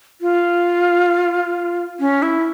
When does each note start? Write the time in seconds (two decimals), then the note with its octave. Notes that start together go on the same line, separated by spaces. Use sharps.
0.21 F4
2.00 C#4
2.22 E4